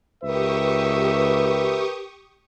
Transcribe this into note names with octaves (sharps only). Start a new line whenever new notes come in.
C#2 G4 A#4 B4 E5 C#6 D#6